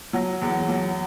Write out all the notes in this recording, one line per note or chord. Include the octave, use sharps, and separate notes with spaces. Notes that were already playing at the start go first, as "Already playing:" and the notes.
F#3
E2
F#3